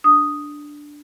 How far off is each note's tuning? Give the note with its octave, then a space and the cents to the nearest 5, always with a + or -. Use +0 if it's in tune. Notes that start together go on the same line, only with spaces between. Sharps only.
D4 +0 D#6 +0